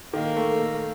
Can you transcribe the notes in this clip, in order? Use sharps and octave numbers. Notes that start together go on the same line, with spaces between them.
D#3 A#3
A3
A3